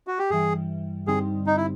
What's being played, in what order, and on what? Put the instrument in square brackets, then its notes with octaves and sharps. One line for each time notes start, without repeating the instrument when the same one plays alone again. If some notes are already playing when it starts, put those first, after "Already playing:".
[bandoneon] F#4
G4
[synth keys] G2 E3 G3 [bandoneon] G#4
[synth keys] G2 D3 G3 C4 D#4 [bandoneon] G#4
[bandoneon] D#4
E4